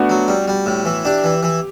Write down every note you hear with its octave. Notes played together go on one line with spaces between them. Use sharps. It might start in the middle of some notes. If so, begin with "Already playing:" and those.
Already playing: A3 B3 D4 F#4
F#3
G3
G3
A2
E3
D4 G4
E3
E3